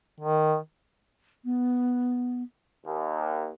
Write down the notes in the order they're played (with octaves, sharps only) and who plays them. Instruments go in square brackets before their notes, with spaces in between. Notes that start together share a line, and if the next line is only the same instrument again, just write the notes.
[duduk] D#3
[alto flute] B3
[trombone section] D#2